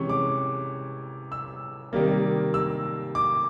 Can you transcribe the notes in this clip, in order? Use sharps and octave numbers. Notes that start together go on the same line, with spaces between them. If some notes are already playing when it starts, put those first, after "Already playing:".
Already playing: C3 E3 G#3 C#4 C#6
D6
E6
C3 D#3 G3 A#3
E6
D6